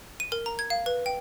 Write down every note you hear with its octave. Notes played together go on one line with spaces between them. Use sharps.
D#7
A#4
A#5
G#6
F5
B4
G5